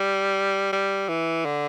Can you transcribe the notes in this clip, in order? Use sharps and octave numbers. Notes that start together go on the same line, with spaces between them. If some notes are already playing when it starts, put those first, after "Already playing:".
Already playing: G3
G3
E3
D3